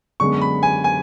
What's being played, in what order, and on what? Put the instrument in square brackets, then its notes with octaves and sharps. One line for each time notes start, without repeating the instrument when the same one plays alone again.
[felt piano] F#2 D3 G#3 B3 [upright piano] C#6
[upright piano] B5
G#5
G#5